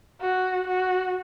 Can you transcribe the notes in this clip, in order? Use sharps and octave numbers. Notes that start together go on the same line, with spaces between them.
F#4
F#4